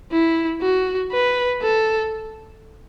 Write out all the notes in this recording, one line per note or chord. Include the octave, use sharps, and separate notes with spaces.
E4
F#4
B4
A4